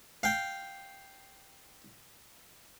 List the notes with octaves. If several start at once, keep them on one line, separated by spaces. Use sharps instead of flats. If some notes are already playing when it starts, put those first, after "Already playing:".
F5 G5